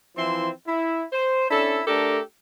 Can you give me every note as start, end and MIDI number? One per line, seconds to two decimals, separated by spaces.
0.16 0.49 52
0.16 0.49 53
0.16 0.49 60
0.16 0.49 64
0.16 0.49 84
0.67 1.03 64
1.12 1.46 72
1.50 1.81 61
1.50 1.81 62
1.50 1.81 64
1.50 1.81 69
1.87 2.20 57
1.87 2.20 62
1.87 2.20 67
1.87 2.20 69
1.87 2.20 70